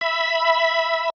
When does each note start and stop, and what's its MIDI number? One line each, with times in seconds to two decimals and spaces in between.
0.01 1.10 76
0.01 1.10 83